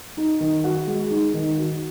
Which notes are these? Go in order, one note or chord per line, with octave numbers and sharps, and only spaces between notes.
D#4
D#3
F#4
G#3
D#4
D#3
F#4